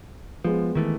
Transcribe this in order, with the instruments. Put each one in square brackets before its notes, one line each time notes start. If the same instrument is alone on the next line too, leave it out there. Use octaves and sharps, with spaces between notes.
[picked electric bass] F3 [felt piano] G#3 B3
[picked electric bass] D#3 E3 A3